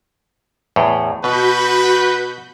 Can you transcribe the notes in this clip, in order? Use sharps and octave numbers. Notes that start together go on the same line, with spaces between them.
E2 A2
B2 F#4 B4 B5 G6